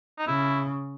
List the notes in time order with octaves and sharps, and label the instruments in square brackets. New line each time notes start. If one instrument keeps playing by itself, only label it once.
[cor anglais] D#4
[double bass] C#3 [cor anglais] E4